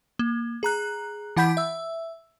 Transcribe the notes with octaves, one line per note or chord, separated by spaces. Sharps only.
A#3
G#4 A#5 F#6
E3 E4 F#5 B5 G6 B6
E5 E6